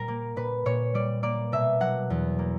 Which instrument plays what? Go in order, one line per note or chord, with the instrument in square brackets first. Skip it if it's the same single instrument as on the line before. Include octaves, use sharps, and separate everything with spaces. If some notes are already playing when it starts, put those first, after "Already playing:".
Already playing: [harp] A#2 G3 A#4
A#3
A#2 B4
A#2 C#5
G3 D5
A#3 D5
B2 E5
F#3 F#5
E2
A#3